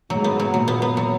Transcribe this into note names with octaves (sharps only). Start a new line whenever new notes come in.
G#2 F#3
B3
F#3
A#2 F#3
B3
B3
F#3